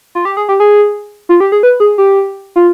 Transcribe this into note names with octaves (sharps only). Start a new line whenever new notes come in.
F4
G4
G#4
G4
G#4
F4
G4
G#4
B4
G#4
G4
F4